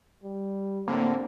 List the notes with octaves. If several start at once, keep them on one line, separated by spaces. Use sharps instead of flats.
G3
A2 D3 A#3 C4